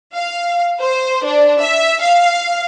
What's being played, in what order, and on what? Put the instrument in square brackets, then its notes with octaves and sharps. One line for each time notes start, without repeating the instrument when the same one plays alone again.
[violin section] F5
C5
D4
E5
F5